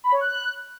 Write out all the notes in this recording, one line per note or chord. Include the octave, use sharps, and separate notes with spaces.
B5
C#5
F#6